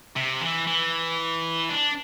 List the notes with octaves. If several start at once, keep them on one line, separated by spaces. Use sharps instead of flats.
C3
E3
E3
D4